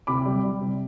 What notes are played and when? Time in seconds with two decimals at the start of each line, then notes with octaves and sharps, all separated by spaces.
0.07 C3 B5 D6
0.26 G3
0.44 G3
0.61 C3